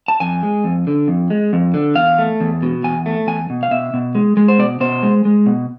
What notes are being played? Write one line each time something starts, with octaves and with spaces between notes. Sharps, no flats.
A5
F2 G#5
G#3
F2
D3
F2
G#3
F2
D3
E2 F5
A3
E2
B2
E2 G#5
A3
E2 G#5
B2
F5
B2 E5
B2
G#3
G#3
C5
B2 D5
B2 C5
G#3
G#3
B2